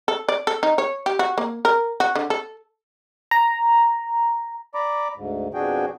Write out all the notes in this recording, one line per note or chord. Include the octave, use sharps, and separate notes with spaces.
A4
D5
A4
D#4
C#5
G4
F#4
A#3
A#4
F#4
D3
A4
A#5
D5 A#5 B5 D6
D2 G#2
F2 B2 D4 F#4 G#4 G5